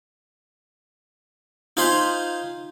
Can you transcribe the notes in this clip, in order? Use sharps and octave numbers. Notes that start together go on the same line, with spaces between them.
D#4 F4 C5 G#5 B5 C6